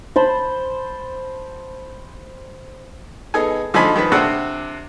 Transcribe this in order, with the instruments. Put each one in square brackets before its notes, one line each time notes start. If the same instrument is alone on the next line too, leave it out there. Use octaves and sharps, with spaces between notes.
[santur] C5 A5 B5
[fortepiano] B3 D#4 G#4 A4 G#5
D3 F3 D#4 C5 G#5 B5
D#3 F3 B4
C3 C4 D4 D5 F#5